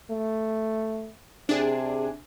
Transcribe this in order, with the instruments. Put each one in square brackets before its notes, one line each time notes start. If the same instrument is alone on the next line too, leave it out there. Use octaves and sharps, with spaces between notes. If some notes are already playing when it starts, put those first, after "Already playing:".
[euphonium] A3
[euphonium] C3 [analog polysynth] D4 G#4